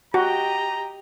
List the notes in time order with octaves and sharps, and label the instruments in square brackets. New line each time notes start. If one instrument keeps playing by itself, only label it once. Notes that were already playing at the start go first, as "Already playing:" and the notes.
[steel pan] F#4 [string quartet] G4 D#5 G5 [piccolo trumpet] A#5